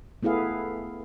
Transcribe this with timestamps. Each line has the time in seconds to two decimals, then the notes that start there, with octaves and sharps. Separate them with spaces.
0.23 A3 B3 E4 G#4 F5